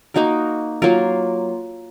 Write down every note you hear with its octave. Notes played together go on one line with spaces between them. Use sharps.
A#3 D#4 F#4 A#4
F#3 A#3 F4 A#4